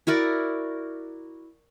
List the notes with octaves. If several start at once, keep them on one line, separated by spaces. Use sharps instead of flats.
E4 F#4 A#4 D5